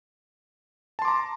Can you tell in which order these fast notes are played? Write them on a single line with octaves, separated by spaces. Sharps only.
A5 C6 D6 A#5